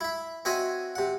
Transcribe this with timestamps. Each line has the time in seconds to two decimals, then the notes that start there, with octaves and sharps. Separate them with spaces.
0.01 E4 E5
0.45 C4 F#4 C#5 D#5 E5 G#5
0.95 C3 F#5